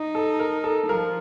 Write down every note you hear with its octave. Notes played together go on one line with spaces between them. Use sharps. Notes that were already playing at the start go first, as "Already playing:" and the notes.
Already playing: D#4
A4
A#4
A4
F3 A#4